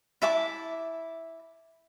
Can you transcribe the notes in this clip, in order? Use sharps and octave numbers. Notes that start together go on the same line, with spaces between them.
E4 E5 A5 D6